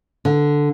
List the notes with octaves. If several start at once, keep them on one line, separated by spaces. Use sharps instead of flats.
D3